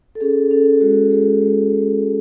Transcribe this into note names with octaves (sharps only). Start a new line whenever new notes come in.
A4
C#4 G#4
C#4 A4
G#3 F#4
G#3 G#4
G#3
G#3
G#3